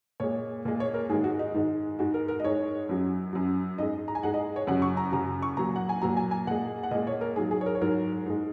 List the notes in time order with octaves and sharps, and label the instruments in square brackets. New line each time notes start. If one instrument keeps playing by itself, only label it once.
[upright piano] A#2 G#3 C#5
A#2 G#3
C#5
A#4
G#2 G#4
D#3 G#3
F#4
D#4
G#2 D#3 G#3
G#2 G#3 F#4
A#4
A#4
D#5
G#2 G#3 C#5
F#2 F#3
F#2 F#3
G#2 G#3 D#5
A#5
G#5
G#2 G#3 F#5
D#5
C#5
F#2 C#3 F#3 F#5
C#6
A#5
F#2 C#3 F#3 A#5
C#6
A#2 F#3 A#5
F#5
G#5
A#2 F#3 A#5
G#5
G#5
A#2 G#3 F#5
F#5
A#2 G#3 D#5
C#5
A#4
G#2 F#3 G#4
G#4
C#5
A#4
C#5
G#2 F#3 A#4
G#2 G#3